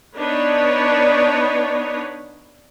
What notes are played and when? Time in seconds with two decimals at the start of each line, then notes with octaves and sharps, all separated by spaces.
0.15 B3 D4 D#4 B4 C#5